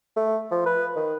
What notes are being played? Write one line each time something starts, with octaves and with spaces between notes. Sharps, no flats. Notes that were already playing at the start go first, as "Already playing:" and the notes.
A3
F3
B4
D#3